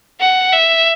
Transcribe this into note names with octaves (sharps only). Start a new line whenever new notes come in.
F#5
E5